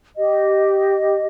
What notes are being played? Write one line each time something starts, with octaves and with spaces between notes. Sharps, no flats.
G4 D#5